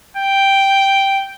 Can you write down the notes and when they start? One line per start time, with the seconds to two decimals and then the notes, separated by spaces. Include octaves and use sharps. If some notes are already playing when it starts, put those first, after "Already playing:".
0.17 G5